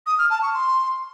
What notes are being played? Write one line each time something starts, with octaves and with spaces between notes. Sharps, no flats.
D#6
F6
A5
C#6
C6